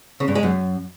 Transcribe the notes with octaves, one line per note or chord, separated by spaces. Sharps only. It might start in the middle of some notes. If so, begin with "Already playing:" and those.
C#3
G2
G#3
F#2